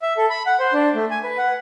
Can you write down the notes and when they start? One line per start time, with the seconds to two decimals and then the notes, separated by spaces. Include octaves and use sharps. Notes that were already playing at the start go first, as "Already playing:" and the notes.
0.02 E5
0.17 A4
0.30 B5
0.47 F#5
0.60 C5
0.73 D4
0.95 A3
1.11 G#5
1.24 B4
1.38 F#5